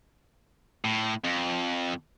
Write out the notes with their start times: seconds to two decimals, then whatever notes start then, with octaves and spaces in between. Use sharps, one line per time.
0.85 A2
1.24 F2